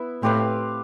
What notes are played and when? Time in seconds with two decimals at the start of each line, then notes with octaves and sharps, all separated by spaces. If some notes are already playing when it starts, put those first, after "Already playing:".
Already playing: B3 E4 E5
0.23 A2 C4 G4 B4 F5